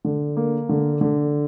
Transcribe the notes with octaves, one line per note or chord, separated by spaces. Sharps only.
D3
A#3
D3
D3